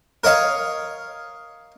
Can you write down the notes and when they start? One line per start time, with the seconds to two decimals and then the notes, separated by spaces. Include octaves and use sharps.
0.24 A#4 C#5 D#5 F5